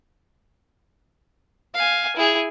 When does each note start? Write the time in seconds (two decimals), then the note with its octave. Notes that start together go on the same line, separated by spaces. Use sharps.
1.74 F5 G#5
2.17 E4 G#4